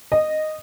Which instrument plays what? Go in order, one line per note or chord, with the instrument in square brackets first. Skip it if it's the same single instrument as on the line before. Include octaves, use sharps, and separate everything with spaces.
[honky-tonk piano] D#5